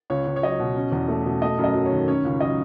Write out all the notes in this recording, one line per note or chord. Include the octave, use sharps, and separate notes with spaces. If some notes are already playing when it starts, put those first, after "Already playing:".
C#2 C#5
C#2
C#5
F#3 D#5
B2
C#4
E2
A3
B2
A3 D#5
F#2
D#5
F#3
C#5
D#3
C#4 C#5
C#2
F#3 D#5